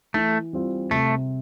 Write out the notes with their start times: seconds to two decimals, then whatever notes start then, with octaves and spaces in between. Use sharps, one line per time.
0.14 E3 A3
0.53 G3 C4 F4
0.91 C3 A3